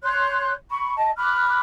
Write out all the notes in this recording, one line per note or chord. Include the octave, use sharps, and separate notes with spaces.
C#5 C6 F#6 G6
B5 C#6
D#5 A5
B5 D6 F6 F#6